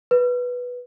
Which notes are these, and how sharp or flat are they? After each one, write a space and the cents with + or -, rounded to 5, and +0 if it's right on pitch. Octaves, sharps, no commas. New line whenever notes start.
B4 -5